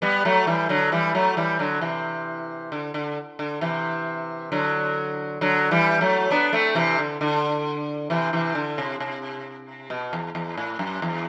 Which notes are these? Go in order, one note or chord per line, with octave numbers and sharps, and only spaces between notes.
G3 B3
F#3 A3
E3 G3
D3 F#3
E3 G3
F#3 A3
E3 G3
D3 F#3
C3 E3
D3
D3
D3
C3 E3
D3 F#3
D3 F#3
E3 G3
F#3 A3
B3 D4
A3 C4
C3 E3
D3
D3
C3 E3
C3 E3
D3
C3
C3
B2
E2
E2
A2
F#2
E2